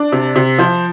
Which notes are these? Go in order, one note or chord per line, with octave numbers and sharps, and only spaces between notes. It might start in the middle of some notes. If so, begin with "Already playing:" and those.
Already playing: D4 D6
C3
C3
F3 C5